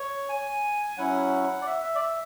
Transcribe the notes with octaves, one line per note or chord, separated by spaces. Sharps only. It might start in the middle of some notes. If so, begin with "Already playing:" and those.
Already playing: C#5
G#5
F#3 C#4 E4 F#5
D5
E5
E5
D5
E5